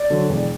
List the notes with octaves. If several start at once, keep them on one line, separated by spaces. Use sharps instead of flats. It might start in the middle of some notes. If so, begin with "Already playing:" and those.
Already playing: D5
D3 F#3
E1